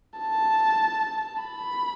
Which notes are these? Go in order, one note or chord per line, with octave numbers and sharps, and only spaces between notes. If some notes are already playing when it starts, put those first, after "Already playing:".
A5
B5